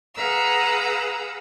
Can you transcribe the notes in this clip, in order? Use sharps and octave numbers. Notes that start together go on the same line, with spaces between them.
G#4 B4 F5 F#5 A#5 E6